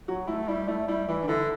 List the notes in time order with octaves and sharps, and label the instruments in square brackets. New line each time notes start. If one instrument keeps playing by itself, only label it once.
[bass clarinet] F#3 [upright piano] F#4
[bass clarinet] A3 [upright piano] E4
[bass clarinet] G3 [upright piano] E4
[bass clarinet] A3 [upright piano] E4
[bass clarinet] G3 [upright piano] E4
[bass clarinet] E3 [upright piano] E4
[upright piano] D4
[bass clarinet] D3 [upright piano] E4